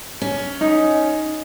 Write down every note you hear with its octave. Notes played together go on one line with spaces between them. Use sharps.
C#4
D#4